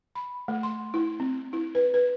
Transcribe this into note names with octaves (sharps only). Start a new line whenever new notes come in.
B5
A3
C6
E4
C4
E4
B4
B4